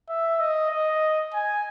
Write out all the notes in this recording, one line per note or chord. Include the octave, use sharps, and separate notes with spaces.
E5
D#5
D#5
G#5